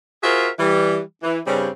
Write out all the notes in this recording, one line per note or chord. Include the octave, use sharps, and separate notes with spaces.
F4 F#4 G#4 A#4 C5 E5
E3 G3
E3
G2 C#3 G3 C4 C#4